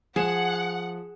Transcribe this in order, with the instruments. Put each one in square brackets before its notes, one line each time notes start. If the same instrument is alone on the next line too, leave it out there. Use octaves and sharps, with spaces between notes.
[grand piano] F3 E7 [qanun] G#4 [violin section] F#5